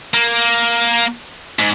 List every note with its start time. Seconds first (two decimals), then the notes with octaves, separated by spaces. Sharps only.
0.14 A#3
1.59 G#2